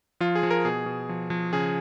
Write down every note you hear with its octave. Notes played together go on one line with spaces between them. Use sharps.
F3 F4
G#4
F3
A#4
B2 G#4
B2
F3
F3
C#3 G#4